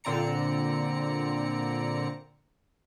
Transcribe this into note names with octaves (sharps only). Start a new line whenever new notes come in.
A#2 D3 C4 D5 A#5 C#7